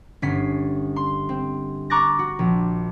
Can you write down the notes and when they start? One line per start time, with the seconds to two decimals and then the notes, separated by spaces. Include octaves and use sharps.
0.22 G1 C#4 B6 C7
0.96 C6
1.29 C4
1.90 A#5 C#6 D6 F#6 A6 A#6
2.19 F#4
2.39 A#1